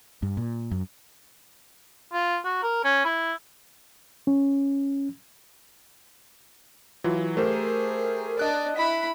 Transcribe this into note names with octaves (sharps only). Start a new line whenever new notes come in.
G2
A#2
F#2
F4
F#4
A#4
C#4
E4
C#4
E3 F#3 F4
A3 G4 G#4 A#4 C5
D4 D5 D#5 F#6
E4 B5 B6